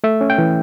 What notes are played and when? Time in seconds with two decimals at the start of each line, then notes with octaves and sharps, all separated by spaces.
0.04 A3 E5
0.21 C#4
0.30 G5
0.38 E3